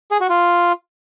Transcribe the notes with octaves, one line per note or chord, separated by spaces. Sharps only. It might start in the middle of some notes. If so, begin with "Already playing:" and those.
G#4
F#4
F4